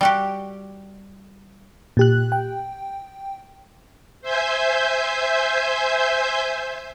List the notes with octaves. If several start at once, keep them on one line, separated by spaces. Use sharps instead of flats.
G3 F#4 G4
A#2 G4 F#6
G5
C5 E5 G#5 G6